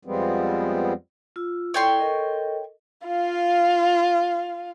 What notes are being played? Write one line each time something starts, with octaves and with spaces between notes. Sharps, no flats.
F2 F3 G3 G#3 B3 C4
F4 E6
E4 A4 C#5 D5 G5 C6
A4 A#4 D#5
F4 F5